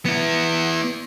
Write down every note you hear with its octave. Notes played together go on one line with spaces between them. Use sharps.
B3 E4